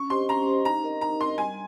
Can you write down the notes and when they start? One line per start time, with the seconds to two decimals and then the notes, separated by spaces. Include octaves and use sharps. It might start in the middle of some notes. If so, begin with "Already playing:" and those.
Already playing: C#4 C#6
0.10 G4 C5 D#5 C6
0.29 C#4 A#5
0.47 G4 C5 D#5
0.65 D#4 A#5
0.84 A#4 D#5
1.01 D#4 A#5
1.20 A#4 D#5 C6
1.38 G3 G#5